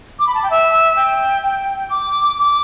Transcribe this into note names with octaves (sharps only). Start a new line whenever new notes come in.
D6
B5
A5
G5
E5
G5
G5
D6
D6